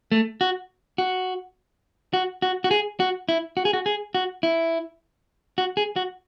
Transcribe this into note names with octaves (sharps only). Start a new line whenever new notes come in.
A3
F#4
F#4
F#4
F#4
F#4
G#4
F#4
E4
F#4
G#4
F#4
G#4
F#4
E4
F#4
G#4
F#4